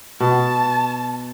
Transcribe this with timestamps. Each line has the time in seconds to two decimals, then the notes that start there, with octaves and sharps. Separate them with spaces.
0.20 B2 A5